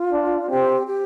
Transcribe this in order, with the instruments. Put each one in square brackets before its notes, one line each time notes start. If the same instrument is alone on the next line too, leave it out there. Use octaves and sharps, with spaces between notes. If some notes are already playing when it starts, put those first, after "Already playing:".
Already playing: [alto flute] F4
[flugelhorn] D4
[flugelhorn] C4 [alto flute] G4
[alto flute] G4